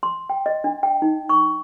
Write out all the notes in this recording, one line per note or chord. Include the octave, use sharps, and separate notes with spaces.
C6
G5
D#5
D4
G5
D#4
C#6